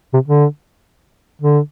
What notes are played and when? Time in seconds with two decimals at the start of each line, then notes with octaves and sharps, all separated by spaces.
0.13 C3
0.28 D3
1.42 D3